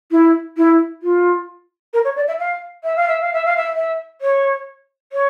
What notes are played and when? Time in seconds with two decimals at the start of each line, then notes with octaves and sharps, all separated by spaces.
0.11 E4
0.57 E4
1.03 F4
1.94 A#4
2.05 C#5
2.16 D5
2.28 E5
2.39 F5
2.84 E5
2.96 F5
3.08 E5
3.21 F5
3.33 E5
3.45 F5
3.57 E5
3.76 E5
4.21 C#5
5.13 C#5